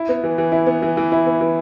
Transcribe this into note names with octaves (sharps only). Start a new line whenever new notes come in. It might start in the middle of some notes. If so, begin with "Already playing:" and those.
Already playing: E4
B3
E3
E3
E4
B3
E3
E3
E4
B3
E3